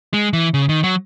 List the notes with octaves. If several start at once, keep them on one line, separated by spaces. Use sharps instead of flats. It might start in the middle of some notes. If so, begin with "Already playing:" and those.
G#3
E3
C#3
D#3
F#3